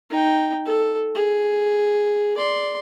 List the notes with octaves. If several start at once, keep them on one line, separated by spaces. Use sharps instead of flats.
D#4 G5
A4
G#4
D5 C6